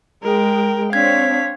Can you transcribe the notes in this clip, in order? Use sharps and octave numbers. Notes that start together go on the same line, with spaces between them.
G#3 A#4 G5
C4 D4 C#5 F5 G#6 B6